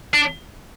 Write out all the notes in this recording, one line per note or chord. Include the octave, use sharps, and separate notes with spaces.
D4